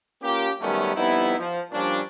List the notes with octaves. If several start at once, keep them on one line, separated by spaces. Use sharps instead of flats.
A#3 C#4 F4 G4
F#2 D#3 G3 A3 B3 C#4
F2 G3 B3 D#4 E4
F3
A#2 F3 G3 C#4 D4